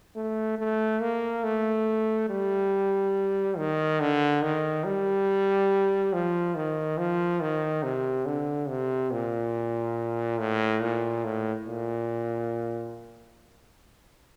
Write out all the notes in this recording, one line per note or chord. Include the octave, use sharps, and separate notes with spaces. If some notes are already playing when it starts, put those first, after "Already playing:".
A3
A3
A#3
A3
G3
D#3
D3
D#3
G3
F3
D#3
F3
D#3
C3
D3
C3
A#2
A2
A#2
A2
A#2